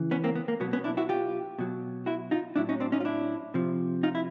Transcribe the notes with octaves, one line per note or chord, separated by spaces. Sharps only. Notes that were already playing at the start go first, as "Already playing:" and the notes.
Already playing: C#3 E3
B3 C#4
A#3 C4
B3
A#3
B2 F#3 B3
B3 C#4
D4 E4
E4 F#4
F4 G4
B2 F#3
E4 F#4
D#4 F4
A2 F#3 D4 E4
C#4 D#4
C4 D4
C#4 D#4
F4
D4 E4
C3 F3
D#4 F4
E4